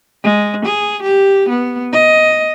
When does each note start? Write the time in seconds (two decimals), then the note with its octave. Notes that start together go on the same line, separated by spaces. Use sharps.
0.23 G#3
0.65 G#4
1.02 G4
1.49 B3
1.92 D#5